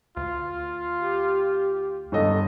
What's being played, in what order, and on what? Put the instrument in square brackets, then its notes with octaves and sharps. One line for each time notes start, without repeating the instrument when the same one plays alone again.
[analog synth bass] D2 [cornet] F4
[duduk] G4
[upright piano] G1 A4 D#5